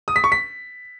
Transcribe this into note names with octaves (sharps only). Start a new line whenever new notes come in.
D#6
B6
C#6
B6